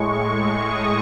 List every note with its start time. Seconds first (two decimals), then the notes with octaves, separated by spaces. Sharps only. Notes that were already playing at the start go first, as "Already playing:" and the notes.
Already playing: A2 G#3 C#6
0.30 C#6
0.71 D#6